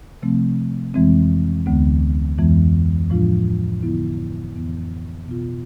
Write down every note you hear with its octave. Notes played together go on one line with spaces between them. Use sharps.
C3 F3 A3 C4
F2 E3 G#3 C4
D2 D3 G#3 B3
F2 E3 G#3 B3
A2 F3 G#3 D4 F4
D3 F3 B3 E4
F2 E3 B3
B2 B3 F4